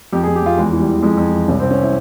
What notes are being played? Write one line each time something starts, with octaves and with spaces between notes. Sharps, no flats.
F2 G4
G#4
F2
G4
F2 F4
E2 G#3
E3
G3
E3
F2 G#3
F2
E3
C2 C#4
C4
C2
C#4
E4